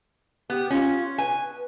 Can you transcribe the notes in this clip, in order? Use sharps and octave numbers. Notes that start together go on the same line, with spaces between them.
B3 G4
C#4 F4
B4 G#5